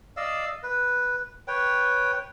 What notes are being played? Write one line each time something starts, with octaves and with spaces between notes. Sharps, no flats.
D5 D#5 F5 E6
B4
B4 C#5 G5